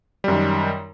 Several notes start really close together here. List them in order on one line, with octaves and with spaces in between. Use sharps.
G3 F#2 D#3